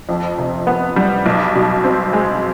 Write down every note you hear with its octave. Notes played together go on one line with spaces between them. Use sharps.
F2
C3
B3
G3
B1
B2
C4
G#3